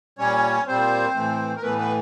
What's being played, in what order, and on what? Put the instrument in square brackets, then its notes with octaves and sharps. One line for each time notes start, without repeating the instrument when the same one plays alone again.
[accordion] A#2 G3 C#4 C#5
A#2 G3 C4 C5
A2 E3 A3
A#4
A2 E3 A3 B3 B4
B3 B4